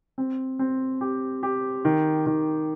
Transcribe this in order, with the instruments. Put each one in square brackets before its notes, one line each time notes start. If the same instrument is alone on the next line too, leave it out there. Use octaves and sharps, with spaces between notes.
[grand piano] C4
C4
G4
G4
D#3
D#3